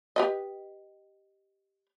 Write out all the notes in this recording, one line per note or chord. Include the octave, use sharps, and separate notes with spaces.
G4 B4 D#5